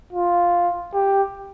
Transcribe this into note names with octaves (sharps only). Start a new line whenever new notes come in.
F4
G4